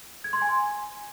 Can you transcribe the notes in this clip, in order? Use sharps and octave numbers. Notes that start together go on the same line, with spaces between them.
G#6
C6
G#5